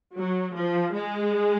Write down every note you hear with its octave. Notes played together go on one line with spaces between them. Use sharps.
F#3
F3
G#3